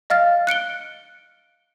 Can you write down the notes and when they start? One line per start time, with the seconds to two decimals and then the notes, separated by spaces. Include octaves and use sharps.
0.10 D#5 F5 F6 A6
0.47 F#6 C#7 D7 G7